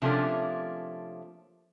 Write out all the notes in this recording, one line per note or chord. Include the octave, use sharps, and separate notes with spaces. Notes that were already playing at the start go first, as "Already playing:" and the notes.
C3 F3 A3 A#3 C#4 D4